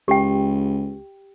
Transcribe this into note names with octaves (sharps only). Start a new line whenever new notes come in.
C#2 G4 G5